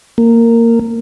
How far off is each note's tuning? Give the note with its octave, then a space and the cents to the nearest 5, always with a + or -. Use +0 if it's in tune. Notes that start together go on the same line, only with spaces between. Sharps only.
A#3 -15